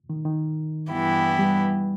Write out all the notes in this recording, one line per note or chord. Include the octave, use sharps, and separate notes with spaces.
D#3
D#3
G2 E3 B3 E4 G4
G3